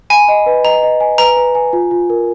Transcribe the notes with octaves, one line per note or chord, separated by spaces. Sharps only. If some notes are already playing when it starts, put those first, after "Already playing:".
G#5 B5
D#5
B4
D#5 A#5
D#5
G#5
B4 A#5
B4
G#5
F4
F4
A#4